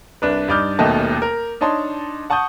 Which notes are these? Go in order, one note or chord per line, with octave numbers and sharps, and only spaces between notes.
C2 D4 B4
G2 D#4 D5 D6 F6 G6
D#1 D#2 B2 A3 D#5 A5
A#4
D4 D#4 C#5 A5 C6
F#5 A5 C#6 D#6 G6